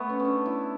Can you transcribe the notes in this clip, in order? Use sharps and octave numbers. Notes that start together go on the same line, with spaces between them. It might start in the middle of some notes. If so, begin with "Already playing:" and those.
Already playing: A3 B3
C#4
C#4
D4
E4